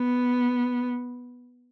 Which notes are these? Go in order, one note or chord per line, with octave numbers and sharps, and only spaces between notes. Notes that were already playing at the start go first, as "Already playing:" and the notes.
Already playing: B3